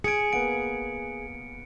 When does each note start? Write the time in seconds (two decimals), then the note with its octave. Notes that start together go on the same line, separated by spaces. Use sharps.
0.04 G#4 G#5 G#6 C#7 D7
0.33 A#3 B3 F#5 D7